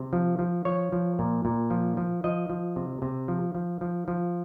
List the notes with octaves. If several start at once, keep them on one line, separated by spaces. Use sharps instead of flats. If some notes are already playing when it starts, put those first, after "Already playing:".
Already playing: C3
F3
F3
F3 C#5
F3
A#2
A#2
F3
F3
F3 D#5
F3
C3
C3
F3
F3
F3
F3